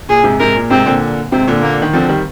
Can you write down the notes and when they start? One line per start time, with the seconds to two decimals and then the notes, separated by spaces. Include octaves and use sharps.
0.09 A#2 G#4
0.24 G#2 C3
0.40 G#2 C3 A#4
0.56 A#2
0.70 G#2 C3 C4
0.86 A#2 D3
1.32 G#2 C3 C4
1.47 A#2 D3
1.62 A#3
1.82 D#3
1.93 D3 F3 C4
2.09 D#3 G3